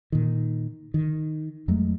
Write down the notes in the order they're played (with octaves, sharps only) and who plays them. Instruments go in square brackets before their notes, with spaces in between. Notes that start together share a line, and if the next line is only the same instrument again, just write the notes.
[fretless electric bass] A#2 D#3
D#3
F2 F#3 G#3 A3